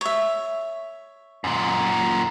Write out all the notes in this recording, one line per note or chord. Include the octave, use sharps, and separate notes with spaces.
C#5 E5
F#2 A#2